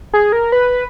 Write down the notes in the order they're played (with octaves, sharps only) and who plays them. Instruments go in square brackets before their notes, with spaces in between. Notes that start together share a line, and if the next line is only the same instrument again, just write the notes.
[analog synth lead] G#4
A#4
B4